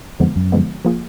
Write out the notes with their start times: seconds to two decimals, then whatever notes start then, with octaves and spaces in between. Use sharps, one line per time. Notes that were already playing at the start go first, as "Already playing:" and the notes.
0.20 F2 D3 F3 G#3 B3
0.36 F#2
0.52 D3 F3 G#3 B3
0.85 F3 A#3 F4 G#4